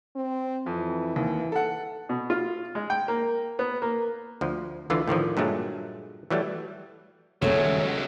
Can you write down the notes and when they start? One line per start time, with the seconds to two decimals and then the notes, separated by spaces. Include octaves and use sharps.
0.16 C4
0.66 F2 E3
1.16 D#2
1.52 A4 F#5
2.09 B2
2.30 F4
2.75 G#3
2.90 G5
3.08 A#3
3.59 B3
3.82 A#3
4.41 D2 F3
4.90 D2 D3 E3 F4
5.08 A2 D3 D#3 F3
5.37 G2 A#2 F#3 G#3 A3
6.30 E3 F#3 G3 A3
7.42 D#1 G#1 C#2 F#3 G#3 A3 C#5